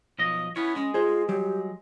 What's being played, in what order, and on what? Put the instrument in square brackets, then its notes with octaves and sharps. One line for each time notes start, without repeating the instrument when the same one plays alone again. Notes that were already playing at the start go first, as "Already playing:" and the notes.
[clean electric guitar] B1 F3 D#5
[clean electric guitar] B3 C#4 C#5 [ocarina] E4
[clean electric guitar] G#3 [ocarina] C#4
[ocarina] F4 [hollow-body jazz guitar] G#4 C5
[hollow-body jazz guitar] F#3 G3 [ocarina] G4